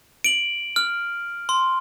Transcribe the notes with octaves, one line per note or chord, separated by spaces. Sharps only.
D7 F#7
F6
C6